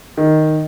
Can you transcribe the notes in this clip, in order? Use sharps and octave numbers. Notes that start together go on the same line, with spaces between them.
D#3